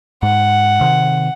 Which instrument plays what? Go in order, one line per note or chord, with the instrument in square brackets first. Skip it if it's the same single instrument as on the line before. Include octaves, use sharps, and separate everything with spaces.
[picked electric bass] G#2 [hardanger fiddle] F#5
[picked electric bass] C3 D#3